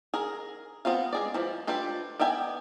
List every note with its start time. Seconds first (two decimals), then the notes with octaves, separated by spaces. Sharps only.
0.14 G#4 A#4
0.85 B3 C4 F4 F5
1.13 G#3 G#4 D5
1.34 E3 F3
1.67 D4 F4 G4 A4 B4
2.19 B3 D5 E5 G5 G#5